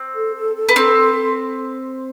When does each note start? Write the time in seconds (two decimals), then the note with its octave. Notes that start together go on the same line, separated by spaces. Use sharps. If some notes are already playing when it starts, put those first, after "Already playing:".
Already playing: C4
0.14 A4
0.35 A4
0.55 A4
0.69 B3
0.76 C4 A4
0.98 C6